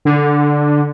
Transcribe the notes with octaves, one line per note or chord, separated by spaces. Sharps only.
D3